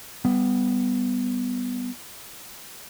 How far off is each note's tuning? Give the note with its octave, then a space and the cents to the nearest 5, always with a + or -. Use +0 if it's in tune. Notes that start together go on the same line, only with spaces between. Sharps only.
G3 +0 B3 +10